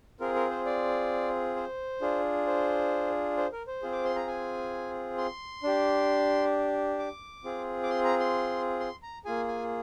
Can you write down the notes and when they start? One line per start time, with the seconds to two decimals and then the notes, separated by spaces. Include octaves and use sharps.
0.20 C4 F4 G#4 A#4
0.35 A#4
0.51 C5
0.66 D5
1.56 C5
2.01 D4 F4 G#4
2.47 C5
3.37 C5
3.52 A#4
3.67 C5
3.82 C4 F4 G#4
3.92 D6
4.04 C6
4.16 A#5
4.27 G#5
5.18 C6
5.63 D4 G4
6.99 D6
7.44 C4 F4 G#4
7.83 D6
7.89 C6
8.04 A#5
8.20 C6
8.80 C6
9.03 A#5
9.25 A#3 F4 G#4 G#5
9.48 G#5